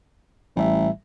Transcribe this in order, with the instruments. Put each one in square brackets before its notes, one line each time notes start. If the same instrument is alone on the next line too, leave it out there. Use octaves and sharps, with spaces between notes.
[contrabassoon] A1 [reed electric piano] A2 G3 E5